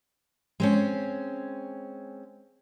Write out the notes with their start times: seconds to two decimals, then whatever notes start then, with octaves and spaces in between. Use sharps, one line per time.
0.60 G#3 C4 C#4